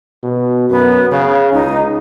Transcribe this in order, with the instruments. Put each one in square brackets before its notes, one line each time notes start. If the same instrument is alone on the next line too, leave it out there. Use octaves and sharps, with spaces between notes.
[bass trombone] B2
[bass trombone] F#2 [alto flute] B3
[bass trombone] C#3 [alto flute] F5
[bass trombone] C#2 [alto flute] D#4